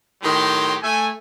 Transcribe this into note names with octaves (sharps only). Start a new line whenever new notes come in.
A2 D#3 F#3 G4 C6
A3 G#5